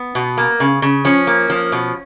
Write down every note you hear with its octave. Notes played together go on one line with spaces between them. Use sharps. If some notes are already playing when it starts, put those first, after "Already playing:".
Already playing: B3
B2
A#3
C#3
C#3
F3 C#4
A#3
F3
B2